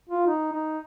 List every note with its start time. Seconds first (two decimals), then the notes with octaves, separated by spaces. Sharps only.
0.09 F4
0.27 D#4
0.52 D#4